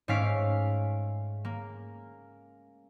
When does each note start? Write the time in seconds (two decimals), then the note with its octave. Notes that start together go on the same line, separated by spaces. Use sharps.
0.08 G#2 A3 C#4 F5 B6 D7
1.45 A#3